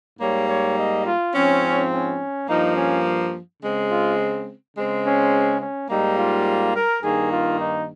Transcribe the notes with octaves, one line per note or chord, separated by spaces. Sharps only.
G#2 G3 A#3 C#5
C#5
D#5
F4
G#2 F3 C4 C#4
C#4
G2 F3 A#3 D#4
C#4
C#3 G#3 C4
F4
C#3 G#3 C4
C#4
C#4
G#2 G3 A#3 D#4
F4
A#4
G2 D#3 A#3 G#4
F4
D#4